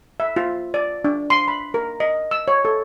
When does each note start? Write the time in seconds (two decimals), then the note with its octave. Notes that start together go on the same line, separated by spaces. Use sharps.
0.20 E5
0.36 F4
0.74 D5
1.04 D4
1.30 C6
1.48 B5
1.74 A#4
2.00 D#5
2.31 E6
2.48 C#5
2.65 A4